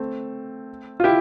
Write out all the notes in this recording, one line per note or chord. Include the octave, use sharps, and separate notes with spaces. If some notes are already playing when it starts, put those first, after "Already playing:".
Already playing: A3 C4
F4
E4 G4